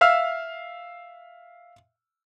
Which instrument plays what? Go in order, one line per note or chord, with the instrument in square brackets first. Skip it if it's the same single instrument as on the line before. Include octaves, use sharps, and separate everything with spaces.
[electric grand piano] E5 F5 E6 F6